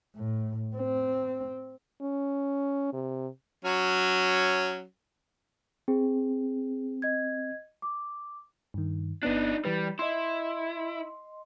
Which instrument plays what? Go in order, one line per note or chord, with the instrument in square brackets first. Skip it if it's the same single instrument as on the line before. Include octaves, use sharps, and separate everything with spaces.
[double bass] A2
C4
[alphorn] C#4
C3
[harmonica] F#3 C#4
[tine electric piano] C4 [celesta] G#4
[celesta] D#5 G#6
D6
[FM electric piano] G2 D#3
[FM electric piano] G1 B3 F#6 [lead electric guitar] D4 D#4
[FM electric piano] E3 B4 [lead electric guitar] G3
[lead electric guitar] E4 [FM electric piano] D#5 C6